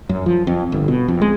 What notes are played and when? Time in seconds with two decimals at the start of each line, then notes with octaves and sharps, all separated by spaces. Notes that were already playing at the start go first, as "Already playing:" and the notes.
0.09 F#2
0.26 F3
0.47 F2
0.72 G1
0.88 B2
1.08 F2
1.21 G#3